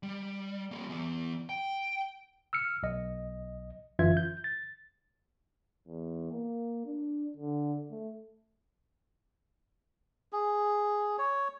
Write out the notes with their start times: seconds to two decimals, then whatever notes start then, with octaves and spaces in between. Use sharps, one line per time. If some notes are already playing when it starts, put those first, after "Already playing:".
0.03 G3
0.71 G3 A#3
0.90 E3 B3
1.49 G5
2.53 E6 F6 C#7
2.83 B1 D#5
3.99 G1 F#2 E3 F4 E5 G#6
4.17 G6
4.44 A6
5.88 E2
6.32 A#3
6.86 D4
7.37 D3
7.91 A3
10.33 G#4
11.18 C#5